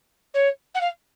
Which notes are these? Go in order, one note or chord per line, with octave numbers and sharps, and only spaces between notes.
C#5
F#5
F5